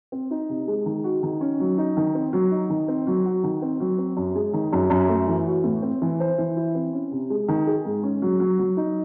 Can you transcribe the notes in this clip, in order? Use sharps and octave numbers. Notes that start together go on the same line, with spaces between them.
C4
D#4
C3
G#3
D#3
F#4
D#3
C#4
F#3
D#4
D#3
C4
F#3
D#4
D#3
C4
F#3
F#4
D#3
C4
F#3
C4
F#2
G#3
D#3
F#2
F#2
A3
E3
F#4
A2
C4
E3
C5
E3
E4
C4
C#4
C3
G#3
D#3
G#4
G#2
C#4
F#3
F#3
F#3
D#4